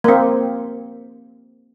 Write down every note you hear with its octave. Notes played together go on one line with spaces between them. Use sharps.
A#3 C4